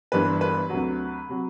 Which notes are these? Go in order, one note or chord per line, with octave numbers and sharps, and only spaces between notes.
G1 G2 E3 G3 B4
B4
D2 C3 F#3
C3 F#3